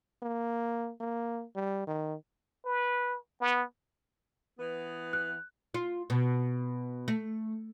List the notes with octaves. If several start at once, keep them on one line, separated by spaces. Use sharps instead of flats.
A#3
A#3
G3
D#3
B4
B3
E3 B3
F#6
F4
B2
A3